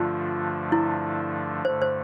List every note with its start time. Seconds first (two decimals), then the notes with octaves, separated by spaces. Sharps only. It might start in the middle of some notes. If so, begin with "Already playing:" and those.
Already playing: G2 D3 F3 A3 D4 F4
0.72 E4
1.65 G2 D3 A3 C5
1.82 C5